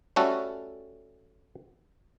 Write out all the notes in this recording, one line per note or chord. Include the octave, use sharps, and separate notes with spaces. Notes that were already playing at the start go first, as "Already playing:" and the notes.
G3 A3 C#4 F#4 A4